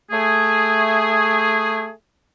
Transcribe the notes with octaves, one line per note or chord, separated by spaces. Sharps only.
A3 G#4